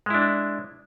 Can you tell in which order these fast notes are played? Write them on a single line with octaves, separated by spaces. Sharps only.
G#3 E4 D4